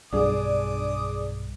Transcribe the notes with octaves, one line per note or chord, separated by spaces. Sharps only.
B1 G2 G3 D4 G#4 D6 D#6